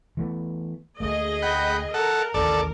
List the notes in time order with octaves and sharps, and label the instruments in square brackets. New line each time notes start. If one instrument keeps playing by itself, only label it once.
[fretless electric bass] E3 A3 B3
[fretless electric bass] D2 A3 A#3 [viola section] G#4 D#5
[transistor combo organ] F#5 G5 B5
[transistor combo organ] A4 F#5 [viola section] A#4
[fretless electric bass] A1 D#2 [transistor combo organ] A4 D5